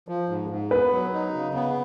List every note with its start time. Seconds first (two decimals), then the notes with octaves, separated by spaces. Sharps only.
0.08 F3
0.29 G#2
0.50 G#2
0.71 B3 B4
0.93 F#3
1.13 D#4
1.34 C#3
1.55 B3